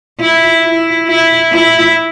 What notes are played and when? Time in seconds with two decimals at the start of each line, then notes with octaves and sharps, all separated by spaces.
0.20 E4
0.65 E4
1.08 E4
1.52 E4